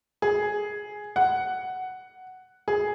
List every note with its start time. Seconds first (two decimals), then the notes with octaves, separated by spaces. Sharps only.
0.22 G#4
1.16 F#5
2.68 G#4